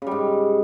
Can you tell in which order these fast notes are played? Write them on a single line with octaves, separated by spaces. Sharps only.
C#3 G3 G#2